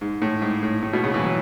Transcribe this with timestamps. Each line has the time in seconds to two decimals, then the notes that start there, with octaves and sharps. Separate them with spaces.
0.01 G#2
0.22 A2
0.42 G#2
0.63 A2
0.83 A2
0.93 B2
1.04 C#3
1.14 E3
1.24 F#3